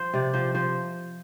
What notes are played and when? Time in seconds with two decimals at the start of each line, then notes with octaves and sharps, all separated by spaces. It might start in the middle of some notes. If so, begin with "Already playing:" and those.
Already playing: F3 C5
0.14 C3 D5
0.33 F3 C5
0.54 F3 C5